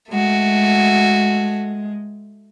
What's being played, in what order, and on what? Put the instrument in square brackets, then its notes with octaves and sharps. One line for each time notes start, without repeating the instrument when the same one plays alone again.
[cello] G#3 [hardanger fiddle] A3 F#4